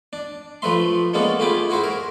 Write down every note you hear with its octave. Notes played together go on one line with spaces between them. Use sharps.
D4
F3 A3 B4 E5 C6
G#3 A#3 B3 C#4 D4 A4
A3 F4 G4 G#4 B5 D6
E4 F#4 G#4 C5 E5
A#4